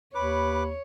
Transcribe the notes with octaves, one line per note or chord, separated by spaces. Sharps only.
D#2 B4 C#5 B5 D6